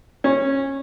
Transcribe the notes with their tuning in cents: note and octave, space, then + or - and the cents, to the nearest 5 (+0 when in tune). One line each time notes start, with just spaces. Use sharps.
C#4 -20